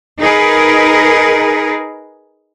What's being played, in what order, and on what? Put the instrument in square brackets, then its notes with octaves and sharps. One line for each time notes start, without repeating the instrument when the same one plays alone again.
[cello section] D#4 G#4 A#4 B4